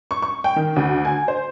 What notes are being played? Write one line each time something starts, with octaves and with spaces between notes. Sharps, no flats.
C#6
C#6
G5
D#3
D2
G#5
C5